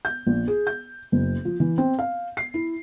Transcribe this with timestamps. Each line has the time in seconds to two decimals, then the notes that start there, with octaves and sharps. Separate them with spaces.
0.05 G6
0.27 A#1
0.48 G#4
0.67 G6
1.12 F#1
1.45 F3
1.60 E3
1.78 C4
1.99 F5
2.37 C7
2.54 E4